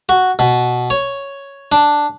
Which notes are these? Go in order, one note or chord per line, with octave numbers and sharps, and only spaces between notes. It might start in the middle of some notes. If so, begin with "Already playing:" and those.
F#4
B2
C#5
D4